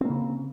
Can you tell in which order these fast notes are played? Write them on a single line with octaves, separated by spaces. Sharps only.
C4 A#3 C#3